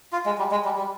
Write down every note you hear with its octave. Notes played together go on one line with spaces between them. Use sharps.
F4
G#3
G3
G#3
G3
G3